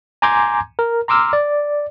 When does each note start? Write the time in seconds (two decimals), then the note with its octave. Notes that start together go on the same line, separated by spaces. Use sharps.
0.22 G#5 A#5 C6 D6 G6 G#6
0.79 A#4
1.08 A#5 C6 D6 E6 F6
1.33 D5